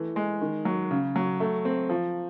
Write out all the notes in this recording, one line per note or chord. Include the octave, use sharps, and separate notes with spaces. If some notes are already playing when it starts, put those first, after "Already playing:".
Already playing: E3 A3
G#3
D#3
F#3
C#3
F#3
A3
C4
F3